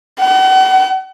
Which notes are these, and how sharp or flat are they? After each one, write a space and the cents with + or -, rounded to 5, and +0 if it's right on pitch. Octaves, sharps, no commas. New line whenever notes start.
F#5 +40